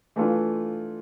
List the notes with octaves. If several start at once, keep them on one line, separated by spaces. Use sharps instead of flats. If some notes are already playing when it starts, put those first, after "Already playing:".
E3 A3 D4 F4